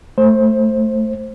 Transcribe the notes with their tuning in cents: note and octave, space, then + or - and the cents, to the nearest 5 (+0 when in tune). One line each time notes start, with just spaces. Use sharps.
A3 +0 C5 +20